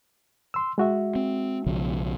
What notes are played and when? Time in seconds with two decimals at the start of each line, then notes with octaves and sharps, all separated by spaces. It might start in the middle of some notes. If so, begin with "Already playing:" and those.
0.54 C6 E6
0.78 G#3 F#4 E5
1.15 C4
1.66 B1 C#3 F3